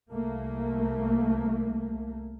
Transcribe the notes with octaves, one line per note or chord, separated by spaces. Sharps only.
C2 A3 A#3